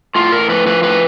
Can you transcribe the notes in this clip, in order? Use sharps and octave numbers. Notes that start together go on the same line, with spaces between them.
A2 F4
A2 A#4
F3 B4
F3 B4
A2 B4